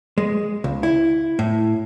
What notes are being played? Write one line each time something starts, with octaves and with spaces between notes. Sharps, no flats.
G#3
C#2
E4
A2